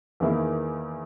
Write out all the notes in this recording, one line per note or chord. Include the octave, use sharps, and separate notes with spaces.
E2 D#3 A#3 E4